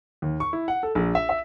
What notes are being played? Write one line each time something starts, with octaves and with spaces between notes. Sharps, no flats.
D#2
C#6
E4
F#5
A4
A#1
E5
E5